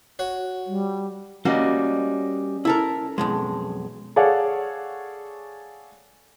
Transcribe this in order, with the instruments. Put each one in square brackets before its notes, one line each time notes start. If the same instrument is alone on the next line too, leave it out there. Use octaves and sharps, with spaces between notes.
[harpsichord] F#4 C#5
[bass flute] G3
[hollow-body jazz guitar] G3 A#3 F#4 [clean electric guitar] C#4 D#5
[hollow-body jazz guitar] E4 A4 A#4
B1 F2 G#3
[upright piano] G#4 A4 C#5 D5 F5 F#5